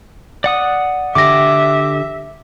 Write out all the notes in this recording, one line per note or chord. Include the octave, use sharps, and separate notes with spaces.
D5 F#5 D#6
D3 G4 E5 D6 A#6